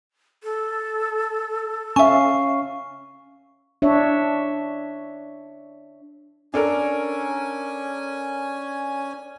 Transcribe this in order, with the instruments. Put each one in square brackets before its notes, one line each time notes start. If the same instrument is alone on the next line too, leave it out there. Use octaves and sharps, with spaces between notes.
[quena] A4
[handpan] C#4 F5 [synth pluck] E5 G#5 [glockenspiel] C#6
[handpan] D4 C#5 E5
[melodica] C#4 G#5 [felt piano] D4 A4 A#4